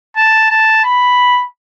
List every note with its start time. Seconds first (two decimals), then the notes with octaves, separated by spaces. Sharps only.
0.16 A5
0.50 A5
0.84 B5